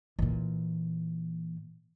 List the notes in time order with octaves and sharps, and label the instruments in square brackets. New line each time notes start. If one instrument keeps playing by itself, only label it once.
[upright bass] A#2 E3